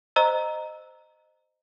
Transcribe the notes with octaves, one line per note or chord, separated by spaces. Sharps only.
C5 D#5 A#5 E6